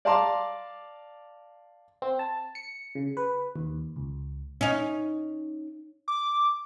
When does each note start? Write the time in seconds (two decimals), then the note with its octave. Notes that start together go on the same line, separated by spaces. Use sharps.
0.05 D5 F5 A5 A#5 C6 D6
2.02 C4
2.19 A5
2.55 C#7
2.95 C#3
3.17 B4
3.56 D#2
3.96 C#2
4.61 C#4 D#4
6.08 D6